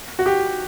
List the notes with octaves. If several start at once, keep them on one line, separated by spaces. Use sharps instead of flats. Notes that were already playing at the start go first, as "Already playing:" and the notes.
F#4
G4